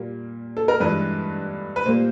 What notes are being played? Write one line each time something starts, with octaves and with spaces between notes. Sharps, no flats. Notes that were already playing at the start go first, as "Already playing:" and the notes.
Already playing: A#2 G3 A#3
A4
A#4
G2 E3 G#3 B4
B4
A#2 G3 A#3 C5